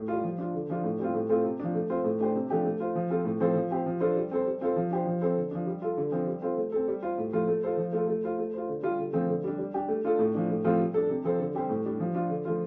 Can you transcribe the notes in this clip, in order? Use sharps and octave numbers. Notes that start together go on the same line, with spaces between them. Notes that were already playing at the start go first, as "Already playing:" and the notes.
Already playing: A2
G3 F4
F3
D4 F4
D3
F3 D4 F4
A2
G3 C4 F4
A2
A3 C4 F4 A4
C3
F3 D4
A3
C4 F4 C5
A2
A3 D4 G4 C5
C3
F3 A3 D4 G4
A3
F4 C5
F3
C4 F4 A4
A2
F3 C4 A4 C5
F3
C4 G4 C5
F3
D4 F4 A4 C5
G3
C4 A4 C5
G3
C4 F4 A4 C5
F3
D4 G4 C5
F3
C4 A4 C5
D3
F3 D4
G3
F4 A4
D3
F3 C4
G3
C4 F4 A4 C5
A3
C4 A4
G3
F4 C5
A2
F3 A3 F4
A3
F4 A4 C5
F3
A3 F4 A4
A3
F4 C5
A3
F4 C5
D3
G3 F4
D3
F3 A3 C4
D3
G3 D4
G3
D4 G4
A3
D4 F4 A4
A2
F3 D4
A2
F3 A3 C4 F4
G3
D4 A4
C3
F3 C4 A4 C5
D3
G3 C4 G4 C5
A2
G3 D4
F3
D4 F4
D3
F3 A3 F4